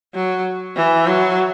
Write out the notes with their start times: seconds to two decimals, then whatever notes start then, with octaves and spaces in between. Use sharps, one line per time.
0.15 F#3
0.76 E3
1.07 F#3